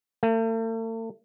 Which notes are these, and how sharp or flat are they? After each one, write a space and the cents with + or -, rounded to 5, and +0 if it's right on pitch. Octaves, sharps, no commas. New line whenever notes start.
A3 +45